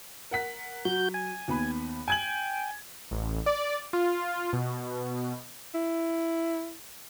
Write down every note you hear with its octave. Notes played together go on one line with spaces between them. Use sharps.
A#4 F#5 B6
F#3 F#4 G6
G#5
D#2 B3 B5
G5 G#5 G#6 F#7
A1
D5
F4
B2
E4